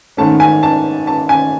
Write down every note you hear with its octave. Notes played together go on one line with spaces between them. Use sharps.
G#2 D#3 A3 C#4 A5
G#5
A5
A5
G#5